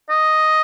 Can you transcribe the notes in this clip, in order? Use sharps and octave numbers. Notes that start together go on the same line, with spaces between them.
D#5